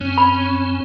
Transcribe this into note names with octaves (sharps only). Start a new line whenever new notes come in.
F#2 C4 C#4
B5